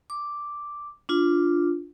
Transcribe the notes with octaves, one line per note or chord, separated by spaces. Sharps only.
D6
D4 F4